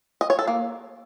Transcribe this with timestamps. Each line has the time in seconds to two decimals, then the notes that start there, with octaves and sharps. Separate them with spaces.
0.21 D#5
0.30 C#5
0.39 A4
0.47 A#3